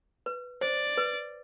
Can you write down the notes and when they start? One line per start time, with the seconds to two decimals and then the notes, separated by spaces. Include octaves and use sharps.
0.26 B4
0.61 C5 D5
0.97 B4